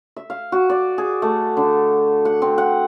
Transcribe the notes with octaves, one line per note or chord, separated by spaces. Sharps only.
E5
F5
F#4
D5
G#4
A3
D3
F#5
C4
F#5